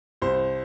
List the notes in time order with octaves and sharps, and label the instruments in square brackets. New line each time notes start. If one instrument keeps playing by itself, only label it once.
[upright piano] C2 C5